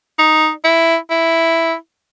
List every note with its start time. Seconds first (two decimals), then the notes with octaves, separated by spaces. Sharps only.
0.19 D#4
0.64 E4
1.10 E4